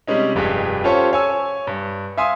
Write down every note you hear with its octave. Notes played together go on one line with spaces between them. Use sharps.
C3 G3 G#3 C#4 D#4
F1 G2 G4 G#4 B6
C#4 F4 G4 A4 C5 C#5
C#5 G#5 E6
G2
E5 F5 G#5 C6 D#6